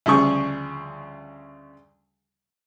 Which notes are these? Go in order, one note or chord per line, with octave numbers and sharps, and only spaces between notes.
D2 C#3 F3 G3 G#4 C#6